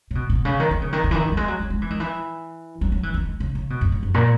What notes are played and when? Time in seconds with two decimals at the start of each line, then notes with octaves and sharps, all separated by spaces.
0.11 C#3
0.15 B2
0.30 B2
0.45 C#3
0.60 D#3
0.71 D#3
0.82 C#3
0.93 D#3
1.04 C#3
1.11 E3
1.15 D#3
1.32 F#3
1.37 G#3
1.48 F#3
1.59 F#3
1.70 G#3
1.82 E3
1.90 D#3
2.00 E3
2.81 F#3
2.92 F#3
3.03 E3
3.14 D#3
3.25 D#3
3.40 C#3
3.55 C#3
3.70 B2
3.81 F#2
3.92 F#2
4.03 F#2
4.14 A#2